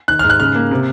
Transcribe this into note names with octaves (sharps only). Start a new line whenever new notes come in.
D#3 F#6
F6
G#2
F#6
C#3 F6
A#3
C3